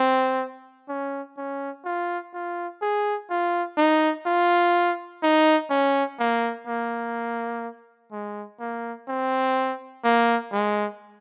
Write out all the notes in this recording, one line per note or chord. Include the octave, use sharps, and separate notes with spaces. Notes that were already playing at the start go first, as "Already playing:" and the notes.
Already playing: C4
C#4
C#4
F4
F4
G#4
F4
D#4
F4
D#4
C#4
A#3
A#3
G#3
A#3
C4
A#3
G#3